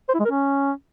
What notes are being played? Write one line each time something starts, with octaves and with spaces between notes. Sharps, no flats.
C5
E4
G#3
A#4
C#4